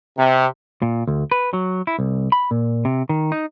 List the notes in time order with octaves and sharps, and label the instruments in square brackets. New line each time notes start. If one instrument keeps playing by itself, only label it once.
[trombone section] C3
[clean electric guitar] A#2
D2
B4
F#3
E4
C2
B5
A#2
C3
D#3
D#4